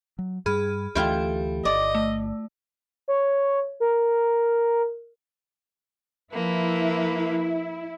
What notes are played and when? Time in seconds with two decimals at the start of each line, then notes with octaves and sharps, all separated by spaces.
0.19 F#3
0.46 G2 G3 G#4 B5 F6
0.95 D2 E3 A3 E4 F4 G4 A4 G5
1.65 G1 D5 D#5
1.95 A3
3.08 C#5
3.80 A#4
6.33 F3 A#3 E4 B4